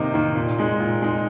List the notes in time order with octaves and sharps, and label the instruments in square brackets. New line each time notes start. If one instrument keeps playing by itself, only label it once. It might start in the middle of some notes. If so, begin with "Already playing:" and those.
Already playing: [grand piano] C3 D#3 A#3 D#4
D#3 A#3 D#4
A#2
G#3 D#4
A#2
G#3 D#4